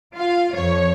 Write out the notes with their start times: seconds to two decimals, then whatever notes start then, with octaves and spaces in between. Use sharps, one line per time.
0.14 F4 F5
0.54 F2 C#5